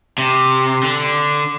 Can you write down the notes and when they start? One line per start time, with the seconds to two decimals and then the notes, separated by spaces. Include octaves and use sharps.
0.18 C3
0.83 D3